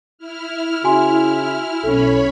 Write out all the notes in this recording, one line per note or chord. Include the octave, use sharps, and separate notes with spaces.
E4 F6
C#3 F#4 G#5 C6
B1 C#4 A4 C#5 B5